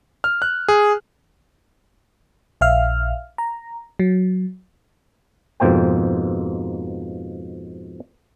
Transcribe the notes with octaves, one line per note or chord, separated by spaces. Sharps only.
F6
F#6
G#4
A#1 E5 F5 F6
A#5
F#3
F2 G#2 B2 A#3 C5 G5